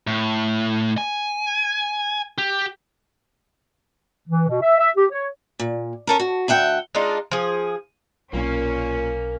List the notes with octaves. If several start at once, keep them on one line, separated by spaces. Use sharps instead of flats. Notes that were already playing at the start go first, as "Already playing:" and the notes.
A2
G#5
G4
E3
B2
E5
E5
G4
C#5
A#2
C#4 A4 A#4
F#4
D2 E5 F#5 G5
G#3 D4 D#4 F4
F3 G#4
B1 A#2 A#3 C#4